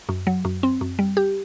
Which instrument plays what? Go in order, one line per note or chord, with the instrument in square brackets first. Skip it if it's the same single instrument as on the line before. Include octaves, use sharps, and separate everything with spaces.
[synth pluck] F#2
F#3
F#2
C4
F#2
G3
G4